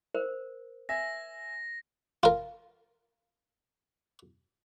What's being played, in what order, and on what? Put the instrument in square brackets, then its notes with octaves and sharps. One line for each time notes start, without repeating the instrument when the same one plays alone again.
[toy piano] A#4 C5
[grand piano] E5 G#5 [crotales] A#6
[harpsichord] F4 A#4